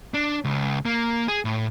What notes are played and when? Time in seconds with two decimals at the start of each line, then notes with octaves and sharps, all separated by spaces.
0.14 D4
0.45 C#2
0.85 A#3
1.28 G#4
1.45 A2